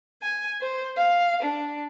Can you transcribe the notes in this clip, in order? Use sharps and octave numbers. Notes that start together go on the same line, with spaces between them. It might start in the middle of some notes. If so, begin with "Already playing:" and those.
G#5
C5
F5
D4